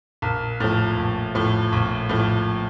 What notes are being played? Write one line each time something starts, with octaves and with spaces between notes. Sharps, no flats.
A#1
A2 F3
A#1
A2 F3
A#1
A2 F3